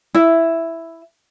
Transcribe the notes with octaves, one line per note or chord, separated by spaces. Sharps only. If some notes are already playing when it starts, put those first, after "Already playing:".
E4 E5